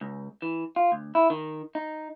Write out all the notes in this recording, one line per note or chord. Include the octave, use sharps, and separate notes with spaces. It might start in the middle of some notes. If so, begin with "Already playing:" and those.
C#2
E3
F4
D2
E4
D#3
D#4